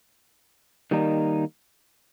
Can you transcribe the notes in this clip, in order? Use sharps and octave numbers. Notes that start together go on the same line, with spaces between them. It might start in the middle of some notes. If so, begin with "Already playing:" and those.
D#3 G3 A#3 D#4